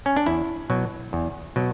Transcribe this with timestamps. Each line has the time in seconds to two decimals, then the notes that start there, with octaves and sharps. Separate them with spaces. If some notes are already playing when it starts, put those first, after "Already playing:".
0.06 C#4
0.16 D4
0.26 E2 E4
0.70 B2 F#3
1.13 E2
1.56 B2 F#3